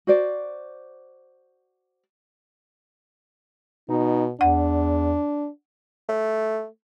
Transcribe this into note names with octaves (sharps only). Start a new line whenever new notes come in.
F#4 C5 D5
B2 D#4
E2 D4 F#5
A3